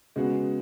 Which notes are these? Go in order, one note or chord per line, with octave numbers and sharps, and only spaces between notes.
C#3 G#3 B3 F#4